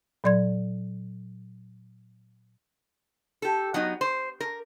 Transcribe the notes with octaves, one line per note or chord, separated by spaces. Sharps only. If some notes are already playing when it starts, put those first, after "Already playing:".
A#2 F#3 D5 C6 G#6
G4 A4
F#3 B3 D#4
C5
A#4